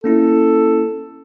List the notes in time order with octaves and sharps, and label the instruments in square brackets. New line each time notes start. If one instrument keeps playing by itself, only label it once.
[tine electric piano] A#3 C#4 E4 [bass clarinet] A4